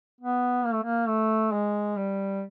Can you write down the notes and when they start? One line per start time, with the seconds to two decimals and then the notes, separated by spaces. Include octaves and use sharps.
0.21 B3
0.64 A#3
0.74 A3
0.83 A#3
1.08 A3
1.52 G#3
1.96 G3